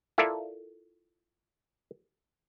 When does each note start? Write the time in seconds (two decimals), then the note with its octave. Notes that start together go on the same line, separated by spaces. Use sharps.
0.18 E4 F4 A4 A#4 D5 E5